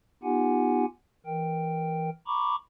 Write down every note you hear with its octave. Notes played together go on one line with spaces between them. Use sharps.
B3 D#4 F4 G4 F#5 G#5
E3 A#4 G5
A#5 B5 C#6 D6